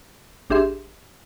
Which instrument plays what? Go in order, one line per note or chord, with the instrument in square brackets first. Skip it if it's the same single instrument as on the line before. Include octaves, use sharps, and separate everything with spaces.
[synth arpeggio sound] A1 D4 G4 G#4 E5 C6